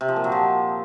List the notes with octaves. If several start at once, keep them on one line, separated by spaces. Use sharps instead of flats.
C3
F3
A#2
F#3
F3